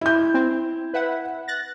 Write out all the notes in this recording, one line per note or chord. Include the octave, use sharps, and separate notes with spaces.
E4 G6
C4
B4 E5 F#5
F#6 A6 A#6